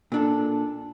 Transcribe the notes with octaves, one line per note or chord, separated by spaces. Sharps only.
A#2 D4 A4